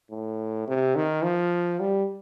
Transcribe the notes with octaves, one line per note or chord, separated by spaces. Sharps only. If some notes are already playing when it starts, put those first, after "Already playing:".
A2
C3
D#3
F3
G3